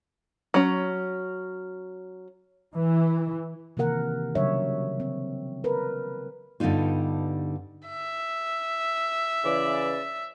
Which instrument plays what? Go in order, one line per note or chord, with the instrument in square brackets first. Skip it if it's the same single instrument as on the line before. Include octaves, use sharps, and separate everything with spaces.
[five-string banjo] F#3 C#4
[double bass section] E3
[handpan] C3 D#3 E3 A#3 A#4 F#5
C#3 F#3 G3 D4 C#5 E5
C4
A#4 B4
[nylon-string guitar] G2 D3 G3 B3 D#4 F4
[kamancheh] E5
[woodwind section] C#3 E3 D5